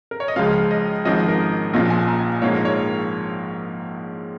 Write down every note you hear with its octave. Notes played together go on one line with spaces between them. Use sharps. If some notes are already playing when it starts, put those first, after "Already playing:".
A#4
C#5
D#5
C#2 C#3 F3 G#3 F4 F5
D#5
G#1 G#2 F3 C#4 D#5
A#4
A#1 A#2 F3 C#4 F4 D#5
G#5
A#5
A#1 G#2 F3 A#3 F4 C#5
A#4
C#5